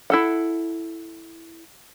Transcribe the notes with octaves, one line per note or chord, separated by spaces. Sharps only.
E4 A4 F#5